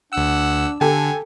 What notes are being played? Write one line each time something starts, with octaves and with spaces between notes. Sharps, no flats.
D2 D4 F#5 E6
D3 G4 A4 G#5